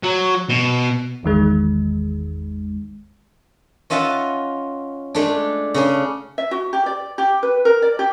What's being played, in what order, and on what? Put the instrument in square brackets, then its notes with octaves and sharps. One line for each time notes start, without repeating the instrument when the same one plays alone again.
[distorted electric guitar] F#3
B2
[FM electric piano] G#1 E2 D#3 G#3
[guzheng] C#4 F4 D#5 E5 F#5 A5
G#3 A3 D4
C#3 C#4 D4
[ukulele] E5
F#4
G4
D5
G4
B4
A#4
D5
G4